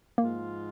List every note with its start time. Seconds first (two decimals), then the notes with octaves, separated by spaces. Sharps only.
0.18 G#2 F3 G#3 A#3 F4